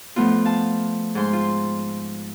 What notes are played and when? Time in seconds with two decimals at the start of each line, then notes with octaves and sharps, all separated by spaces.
0.16 F3 A3 B3 F4
0.45 F5 A5
1.15 G#2 C5 C6
1.33 F4